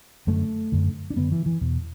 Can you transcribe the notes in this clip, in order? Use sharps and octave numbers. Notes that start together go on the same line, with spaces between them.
F#2 D3 A3
F#2 D3
D4
F#2 D3 B3
E3
E3
E2 B2